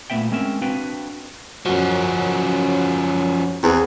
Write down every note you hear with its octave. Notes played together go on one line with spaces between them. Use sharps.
A#2 A3 B3 E5 G5
G#3 C4 C#4 A#4 E5
C4 D4 F#4 B4 F5 G5
F#2 F3 C#4 F#4
E2 C4 G#4